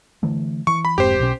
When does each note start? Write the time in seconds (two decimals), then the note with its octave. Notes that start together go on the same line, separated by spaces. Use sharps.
0.23 D3 E3 A3
0.67 E3 C#6
0.85 B5
0.98 F1 G#2 C4 G4 C5
1.19 B1 B2 C#4